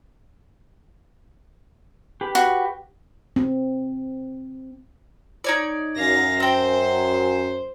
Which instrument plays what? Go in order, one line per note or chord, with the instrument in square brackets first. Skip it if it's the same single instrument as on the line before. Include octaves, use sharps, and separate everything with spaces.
[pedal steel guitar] G4 B4 B5
[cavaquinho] F#4
[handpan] C4
[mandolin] D#4 C#5 D5
[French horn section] F#2 [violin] F5 A#6
[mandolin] C4 G5 [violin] C5